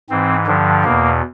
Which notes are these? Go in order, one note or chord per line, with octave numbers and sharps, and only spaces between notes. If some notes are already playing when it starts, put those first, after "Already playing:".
G#2 E3 C4
G2 D3 F3
E2 B2 A#3